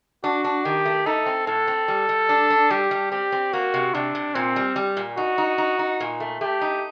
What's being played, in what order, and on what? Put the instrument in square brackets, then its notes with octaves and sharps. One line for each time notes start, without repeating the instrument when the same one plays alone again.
[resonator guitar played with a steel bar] D4 [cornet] F#4
[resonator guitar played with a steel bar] D4
[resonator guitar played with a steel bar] D#3 [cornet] G4
[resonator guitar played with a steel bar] A3
[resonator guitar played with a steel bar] D#4 [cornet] A4
[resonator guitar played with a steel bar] C4
[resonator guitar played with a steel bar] A2 [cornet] A4
[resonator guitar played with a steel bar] C4
G3
G3
D4
D4
[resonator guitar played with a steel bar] G3 [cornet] G4
[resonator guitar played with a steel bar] G3
[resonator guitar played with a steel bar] C4 [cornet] G4
[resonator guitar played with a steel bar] C4
[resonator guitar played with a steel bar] A#3 [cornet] F#4
[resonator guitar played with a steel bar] C3
[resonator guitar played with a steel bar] C3 [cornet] D4
[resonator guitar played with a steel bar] C3
[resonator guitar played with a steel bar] A#2 [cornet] C4
[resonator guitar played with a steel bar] G3
G3
A#2
[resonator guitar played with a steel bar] D#4 [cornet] F#4
[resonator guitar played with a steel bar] D#4
D#4
D#4
A#2
A3
[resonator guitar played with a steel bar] A3 [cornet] G4
[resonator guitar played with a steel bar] D#4